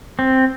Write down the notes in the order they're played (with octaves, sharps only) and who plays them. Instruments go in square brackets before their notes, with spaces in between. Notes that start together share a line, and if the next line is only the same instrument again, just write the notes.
[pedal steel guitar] C4